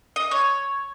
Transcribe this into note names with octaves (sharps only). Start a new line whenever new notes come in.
D#5
C#5